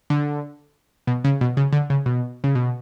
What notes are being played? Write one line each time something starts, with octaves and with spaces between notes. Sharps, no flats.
D3
B2
C#3
B2
C#3
D3
C#3
B2
C#3
B2